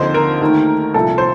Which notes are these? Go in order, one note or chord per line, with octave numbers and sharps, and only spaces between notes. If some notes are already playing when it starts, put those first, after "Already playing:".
Already playing: D#2 D3 F3 C4 C5 D#5
A#4
D#2 D#3 A3
C2 A#2 F3 A4
C5